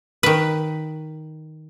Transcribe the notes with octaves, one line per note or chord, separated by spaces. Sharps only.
D#3 B4